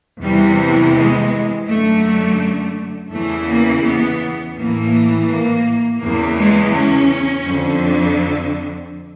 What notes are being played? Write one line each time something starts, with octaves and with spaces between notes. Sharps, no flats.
E2 C3 E3 G3
G#3
F#2 D3 A3
E2 C#3 E3 A3
A#3
B3
A2 E3 A#3
A#3
E2 C#3 E3 A#3
G#3
C#4
F2 D3